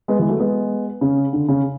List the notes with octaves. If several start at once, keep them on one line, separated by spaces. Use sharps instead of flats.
G#3 B3
E3 G#3
F#3 A3
G#3 B3
C#3
D3
C#3